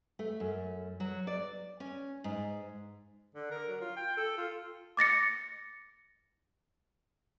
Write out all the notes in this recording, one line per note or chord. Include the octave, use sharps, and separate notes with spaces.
A3
F#2
F#3
D5
C#4
G#2
D3
A#4
F#3
F4
G5
A4
F4
D6 A6 A#6 C#7